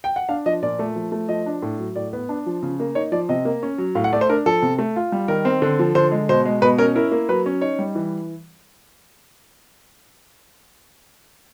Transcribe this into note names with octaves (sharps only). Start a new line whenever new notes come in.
G5
F#5
D4 F5
F3 D#5
A#2 D5
A3
F3
A3
F3 D#5
D4
A2
F#3
A2 D5
B3
D4
F3
C#3
A#3
D#4 C#5
F3 D5
C3 D#5
A#3
C#4
F#3
A2 F5
F#5
A3 D5
C5
D4 A#4
F3 A4
C3
A3
F4
G3
D#3 A#4
C4
D3
F3
D3 C5
G#3
B2 C5
G#3
B2 B4
C#4 A#4
E4 A#4
A#3
F#3 B4
C#4
D#4 C#5
G3
E3